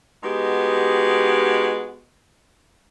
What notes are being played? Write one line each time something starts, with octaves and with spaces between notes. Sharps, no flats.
G#3 B3 D#4 F#4 G4